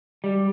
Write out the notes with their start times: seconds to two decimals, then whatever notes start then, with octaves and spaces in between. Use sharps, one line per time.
0.24 G3